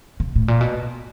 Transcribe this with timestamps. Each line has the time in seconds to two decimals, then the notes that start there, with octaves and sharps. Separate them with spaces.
0.20 C3
0.36 A2
0.48 A#2
0.61 B2